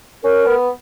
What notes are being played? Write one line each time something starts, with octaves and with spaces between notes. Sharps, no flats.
C#4 A#4
B3